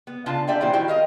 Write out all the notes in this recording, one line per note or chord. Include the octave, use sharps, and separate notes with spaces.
B3
C#3 D4 F4 F5 A5
G4 D5 E5 G5 G#5
A#2 E3 E4 G4 C5
D#3 G3 E4 F#4 G5
A#4 D#5 F5